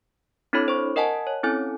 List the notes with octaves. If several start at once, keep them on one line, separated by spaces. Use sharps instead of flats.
C4 D4 E4 A4 C#5 B5
C5 C#6
A#4 D#5 F#5 G#5 A5
C#5
C4 C#4 E4 A4 G#5